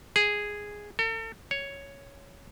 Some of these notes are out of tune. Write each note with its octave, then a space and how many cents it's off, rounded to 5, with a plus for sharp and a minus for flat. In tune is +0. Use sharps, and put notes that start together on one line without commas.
G#4 -5
A4 +40
C#5 +5